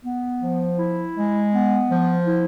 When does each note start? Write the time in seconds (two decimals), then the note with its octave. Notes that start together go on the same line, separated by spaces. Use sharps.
0.03 B3
0.41 F3
0.78 E4
1.16 G#3
1.53 B3
1.90 F3
2.26 E4